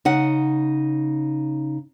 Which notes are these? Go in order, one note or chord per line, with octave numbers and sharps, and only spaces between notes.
C#3 D#4 F#5